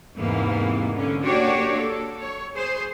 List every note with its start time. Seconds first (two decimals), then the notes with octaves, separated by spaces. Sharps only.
0.15 E2 G#2 C3 E3 A#3 B3
0.94 D3 C#4
1.23 A#3 D4 F#4 G4 C#5 D5
1.76 A4
2.22 C#5
2.53 G#4 C5